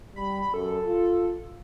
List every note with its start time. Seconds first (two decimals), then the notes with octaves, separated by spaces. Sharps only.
0.16 G3 B5
0.54 F#2 A4
0.85 F4